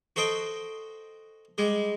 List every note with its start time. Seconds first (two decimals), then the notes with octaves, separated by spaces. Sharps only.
0.16 F#4 A4 C5 D#5 G5
1.58 G3 G#3